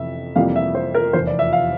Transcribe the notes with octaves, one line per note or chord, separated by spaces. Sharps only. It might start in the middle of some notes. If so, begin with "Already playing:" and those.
Already playing: F2 C3 E3 E5
F2 C3 E3 G3 A#3 F5
E5
C5
A#4
F1 E2 E3 C5
D5
E5
F5